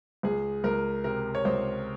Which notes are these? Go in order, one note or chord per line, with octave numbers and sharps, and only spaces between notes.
C#2 G#4
C#2 A#4
C3 A#4
C#5
C#2 C5